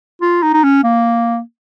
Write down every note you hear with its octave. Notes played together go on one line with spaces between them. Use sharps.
F4
D#4
D#4
C#4
A#3